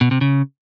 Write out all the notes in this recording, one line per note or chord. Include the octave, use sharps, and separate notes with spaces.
B2
C3
C#3